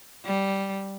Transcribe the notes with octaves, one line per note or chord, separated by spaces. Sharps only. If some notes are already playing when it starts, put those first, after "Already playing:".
G3